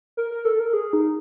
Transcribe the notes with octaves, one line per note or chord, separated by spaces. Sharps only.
A#4
A#4
A4
A#4
G#4
D#4